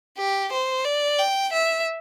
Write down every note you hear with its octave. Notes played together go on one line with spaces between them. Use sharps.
G4
C5
D5
G5
E5